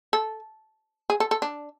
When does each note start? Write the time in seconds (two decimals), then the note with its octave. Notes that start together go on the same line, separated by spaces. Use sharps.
0.13 A4
1.10 G#4
1.20 A4
1.31 A4
1.42 D4